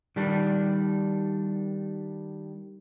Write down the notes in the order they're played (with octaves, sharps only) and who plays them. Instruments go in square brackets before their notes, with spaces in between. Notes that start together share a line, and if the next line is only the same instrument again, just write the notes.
[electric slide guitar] D#3 G3 D4